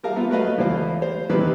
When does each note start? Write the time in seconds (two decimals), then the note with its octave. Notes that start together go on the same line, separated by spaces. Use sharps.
0.03 G3 A#4 E5 F5
0.16 B3 F4
0.30 F#3 A3 B4 D#5 F5
0.58 C#2 E3 A3 C5 F5
1.02 C5
1.30 C3 D#3 E3 G3 G4 B4